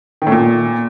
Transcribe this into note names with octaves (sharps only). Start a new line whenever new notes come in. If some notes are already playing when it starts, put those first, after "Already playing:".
D#3
A2
A#2